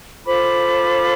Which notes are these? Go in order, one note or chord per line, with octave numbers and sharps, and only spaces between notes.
F4 A4 C5 B5 D6